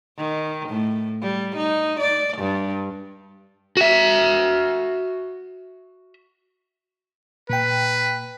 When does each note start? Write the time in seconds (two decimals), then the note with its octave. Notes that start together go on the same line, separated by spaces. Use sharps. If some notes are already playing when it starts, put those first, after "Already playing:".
0.17 D#3
0.69 A2
1.22 G3
1.57 D#4
2.00 D5
2.38 G2
3.77 F#4 E5
7.50 A#2 B4 G5